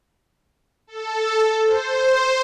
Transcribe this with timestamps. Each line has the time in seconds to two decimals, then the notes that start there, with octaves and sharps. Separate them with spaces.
0.87 A4
1.64 C5